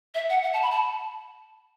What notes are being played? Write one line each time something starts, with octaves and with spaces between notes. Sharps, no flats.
E5
F#5
F#5
A5
B5
A5